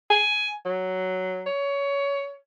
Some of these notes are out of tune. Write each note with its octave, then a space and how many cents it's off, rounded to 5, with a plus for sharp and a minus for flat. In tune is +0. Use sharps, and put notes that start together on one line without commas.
G#5 +10
F#3 +5
C#5 +20